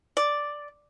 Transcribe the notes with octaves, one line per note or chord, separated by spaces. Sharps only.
D5